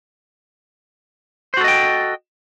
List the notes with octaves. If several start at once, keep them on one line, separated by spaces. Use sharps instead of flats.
F#4 A4 C5 D#5 G5